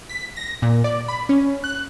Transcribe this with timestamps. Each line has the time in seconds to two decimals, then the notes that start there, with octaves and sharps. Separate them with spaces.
0.09 B6
0.36 A#6
0.62 A#2
0.84 D5
1.08 B5
1.29 C#4
1.64 F#6